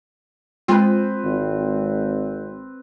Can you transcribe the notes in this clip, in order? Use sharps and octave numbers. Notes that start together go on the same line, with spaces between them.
G#3 C4 F4 B4
G#1